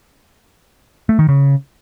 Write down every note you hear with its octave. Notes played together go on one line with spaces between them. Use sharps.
A3
D#3
C#3